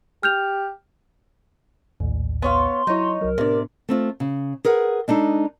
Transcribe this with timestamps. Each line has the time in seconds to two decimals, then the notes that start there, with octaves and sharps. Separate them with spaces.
0.23 G4 F6 G6 F7
2.00 A#1 D#2 A2
2.42 B3 C#5 F5 C6
2.87 F#3 D#4 E4 C#5
3.21 C2 F#3 A#4
3.38 A2 C3 B3 D4 D5
3.89 A3 C4 F4
4.20 C#3
4.65 G#4 A#4 B4 F#5
5.08 G#3 D4 D#4 A4